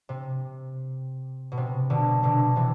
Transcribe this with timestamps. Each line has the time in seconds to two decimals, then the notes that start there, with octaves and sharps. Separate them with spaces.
0.09 C3
1.52 B2
1.57 C3
1.90 B2 D3
2.23 B2 D3
2.56 C3 E3